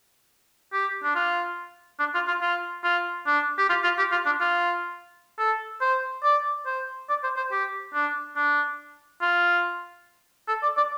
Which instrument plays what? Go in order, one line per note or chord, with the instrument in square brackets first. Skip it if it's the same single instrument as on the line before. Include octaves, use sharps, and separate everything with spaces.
[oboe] G4
D4
F4
D4
F4
F4
F4
F4
D4
G4
F4
F4
G4
F4
D4
F4
A4
C5
D5
C5
D5
C5
C5
G4
D4
D4
F4
A4
D5
D5